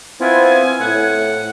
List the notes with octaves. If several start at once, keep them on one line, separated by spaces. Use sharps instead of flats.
B3 C4 E4 F4 G#5
A2 F#5